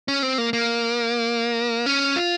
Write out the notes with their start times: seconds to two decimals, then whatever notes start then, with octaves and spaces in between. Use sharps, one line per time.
0.08 C#4
0.23 C4
0.38 A#3
0.53 A#3
1.86 C#4
2.16 F4